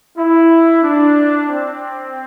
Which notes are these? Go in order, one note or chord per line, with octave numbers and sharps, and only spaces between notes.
E4
D4
C4